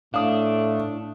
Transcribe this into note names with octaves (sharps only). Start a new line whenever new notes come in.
A2 A3 D4 F5 D#6